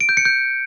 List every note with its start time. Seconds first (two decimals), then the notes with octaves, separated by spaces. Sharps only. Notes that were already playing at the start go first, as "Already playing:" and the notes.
0.01 D7
0.09 G6
0.17 C#7
0.25 G6